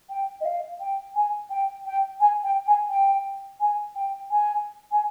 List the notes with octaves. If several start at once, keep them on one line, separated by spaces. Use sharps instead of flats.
G5
D#5
F5
G5
G#5
G5
G5
G#5
G5
G#5
G5
G#5
G5
G#5
G#5